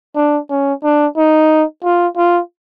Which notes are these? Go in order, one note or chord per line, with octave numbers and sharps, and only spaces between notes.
D4
C#4
D4
D#4
F4
F4